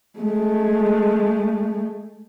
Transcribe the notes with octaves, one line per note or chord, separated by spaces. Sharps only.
G#3 A3